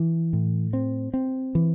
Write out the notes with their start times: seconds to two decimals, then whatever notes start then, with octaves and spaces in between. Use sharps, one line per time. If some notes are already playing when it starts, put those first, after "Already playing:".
Already playing: E3
0.33 A2
0.73 C4
1.14 C4
1.55 E3